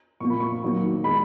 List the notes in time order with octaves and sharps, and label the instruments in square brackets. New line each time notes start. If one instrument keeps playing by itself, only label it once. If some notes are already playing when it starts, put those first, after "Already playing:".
[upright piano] A#2 F3 A#3 C#6
B5
C#6
D#3 F#3 A#3
D#3 G#3 B5